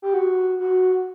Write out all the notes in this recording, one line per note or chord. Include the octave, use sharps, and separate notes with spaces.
G4
F#4
F#4